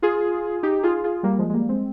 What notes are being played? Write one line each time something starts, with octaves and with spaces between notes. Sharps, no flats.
F4 G#4
D#4 G4
F4 G#4
F4 G#4
G3 A#3
F3 G#3
G#3
G3 A#3
G#3 C4